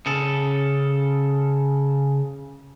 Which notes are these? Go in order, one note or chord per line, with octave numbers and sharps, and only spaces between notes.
C#3 A4